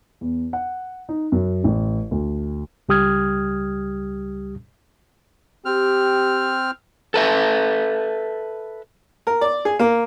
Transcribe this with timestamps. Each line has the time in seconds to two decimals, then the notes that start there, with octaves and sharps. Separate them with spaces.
0.21 E2
0.53 F#5
1.09 D#4
1.32 F#2
1.64 A1
2.11 D2
2.89 C#2 G3 G4 D#6 F6 G#6
5.65 C4 G4 F6
7.14 A4 B4 E5
9.27 A#4
9.41 D5
9.65 G#4
9.79 A#3